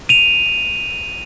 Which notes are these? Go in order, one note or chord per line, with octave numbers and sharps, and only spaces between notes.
D#7 F7